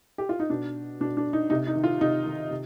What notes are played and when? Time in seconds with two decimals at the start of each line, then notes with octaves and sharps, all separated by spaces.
0.18 G4
0.29 F4
0.40 D#4
0.50 B2 D4
1.00 B2 D4
1.17 D4
1.33 D#4
1.50 C3 D#4
1.67 D#4
1.75 D#3
1.84 F4
2.01 C3 D#4
2.26 D#3
2.50 C3